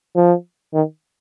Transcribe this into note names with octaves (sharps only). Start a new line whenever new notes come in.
F3
D#3